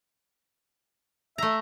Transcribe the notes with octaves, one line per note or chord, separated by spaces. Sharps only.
A3 E5 A#5